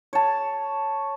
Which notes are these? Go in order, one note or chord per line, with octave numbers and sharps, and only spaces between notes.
C#5 A5